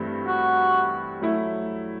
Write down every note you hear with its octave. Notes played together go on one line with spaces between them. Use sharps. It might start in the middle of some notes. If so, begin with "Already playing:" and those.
Already playing: G2 E3 A3 C4
F#4
F#3 A3 E4